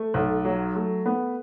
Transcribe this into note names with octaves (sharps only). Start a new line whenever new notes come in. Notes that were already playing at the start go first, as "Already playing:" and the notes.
Already playing: A3
B1
F#3
A3
B3